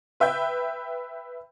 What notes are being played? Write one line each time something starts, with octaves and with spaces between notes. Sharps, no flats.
B4 E5 G5 G6